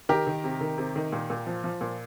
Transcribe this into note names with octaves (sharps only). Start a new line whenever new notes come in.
D#3 G4 A#4
D#3
C3
D#3
C3
D#3
A#2
A#2
F3
F3
A#2